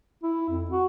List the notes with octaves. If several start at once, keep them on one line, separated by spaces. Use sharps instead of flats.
E4
F2
F#4